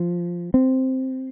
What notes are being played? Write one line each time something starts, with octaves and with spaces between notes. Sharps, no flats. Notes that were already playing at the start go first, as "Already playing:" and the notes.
Already playing: F3
C4